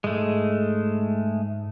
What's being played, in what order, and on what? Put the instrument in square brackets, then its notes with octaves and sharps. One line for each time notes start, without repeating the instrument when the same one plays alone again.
[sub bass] G#2 [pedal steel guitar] G#3 A3